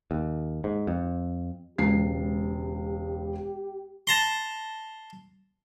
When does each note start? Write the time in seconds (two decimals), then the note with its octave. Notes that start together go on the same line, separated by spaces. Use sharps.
0.11 D#2
0.64 G#2
0.87 F2
1.78 E1 C#2 G4 C7
4.07 A5 A#5 C6